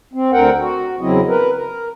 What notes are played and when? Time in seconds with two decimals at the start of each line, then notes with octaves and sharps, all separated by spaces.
0.14 C4
0.32 D2 D3 C4 A#4 F#5 G5
0.61 F#4
1.01 E2 C#3 F#3 C4 E4 D#5
1.28 A#4 B4
1.56 A#4